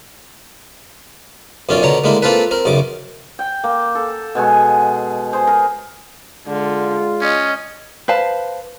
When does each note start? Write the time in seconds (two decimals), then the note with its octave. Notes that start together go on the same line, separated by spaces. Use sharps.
1.69 B1 F#2 C#4 F4 D5
1.82 B2 D3 C#5 A#5
2.04 D3 G#3 A#3 E4
2.22 A#3 C4 F4 A4 B4
2.51 C4 A#4
2.65 B1 F#2 C#3 D6
3.39 G5
3.64 A#3
3.95 A4
4.35 B2 G#3 G#5 C#6
5.33 G#4 C5
5.47 A#4
6.47 D3 G#3 F4
7.22 C#4 D#5
8.08 B4 C5 F5 A5